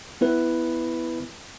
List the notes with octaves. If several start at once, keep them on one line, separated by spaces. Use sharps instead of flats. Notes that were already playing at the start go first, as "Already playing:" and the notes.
B3 E4 B4